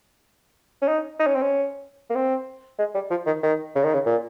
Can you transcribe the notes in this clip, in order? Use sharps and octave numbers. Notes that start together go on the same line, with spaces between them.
C#4
D#4
D#4
C#4
C4
C#4
A#3
C4
G#3
G3
F3
D#3
D#3
C#3
D#3
C#3
A#2